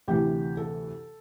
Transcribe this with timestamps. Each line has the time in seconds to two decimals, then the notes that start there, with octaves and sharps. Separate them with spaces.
0.08 D2 C3 E3 G4
0.57 A4